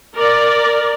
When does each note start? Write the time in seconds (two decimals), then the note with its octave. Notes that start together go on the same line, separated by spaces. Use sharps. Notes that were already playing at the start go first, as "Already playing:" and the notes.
0.15 A#4 D5